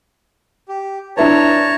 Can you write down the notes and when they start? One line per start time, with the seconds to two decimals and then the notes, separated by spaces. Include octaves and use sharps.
0.69 G4
1.17 D4 E4 B4 C#5 A5 A#5